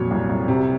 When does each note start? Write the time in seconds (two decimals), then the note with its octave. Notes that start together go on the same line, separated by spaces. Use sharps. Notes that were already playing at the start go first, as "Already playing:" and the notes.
Already playing: F2 A#2 F#3 C#5
0.10 C2
0.29 C2
0.48 C3